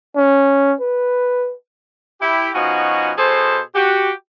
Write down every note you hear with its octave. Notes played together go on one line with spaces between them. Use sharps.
C#4
B4
E4 G4
B2 F3 C#4 D#4 F#4
B2 G#4 A4 C5
F#4 G4